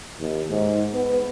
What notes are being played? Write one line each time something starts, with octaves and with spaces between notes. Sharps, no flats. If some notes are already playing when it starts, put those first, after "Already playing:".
D#2
G#2
B3